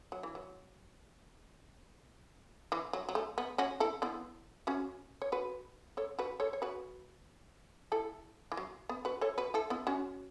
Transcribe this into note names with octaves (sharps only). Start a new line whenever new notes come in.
F#3
E3
F#3
E3
F#3
F#3
A3
B3
C#4 F#4
E4 A4
B3 E4
C#4 F#4
C#5
F#4 B4
A4 C#5
F#4 B4
A4 C#5
C#5
F#4 B4
E4 A4
E3
F#3
B3
F#4 B4
A4 C#5
F#4 B4
E4 A4
B3 E4
C#4 F#4